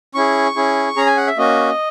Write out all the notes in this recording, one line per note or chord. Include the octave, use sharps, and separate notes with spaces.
C#4 E4 G#4 C#6
C#4 E4 G#4
C#4 G#4 A#5
G#5
F#5
E5
A#3 C#4 F#4 D#5